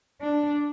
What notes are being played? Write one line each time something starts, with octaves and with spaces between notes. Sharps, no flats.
D4